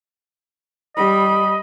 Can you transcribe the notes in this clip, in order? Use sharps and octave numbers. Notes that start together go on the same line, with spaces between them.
G3 D#5 B5